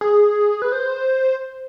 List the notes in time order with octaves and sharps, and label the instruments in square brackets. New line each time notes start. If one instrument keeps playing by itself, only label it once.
[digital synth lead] G#4
B4
C5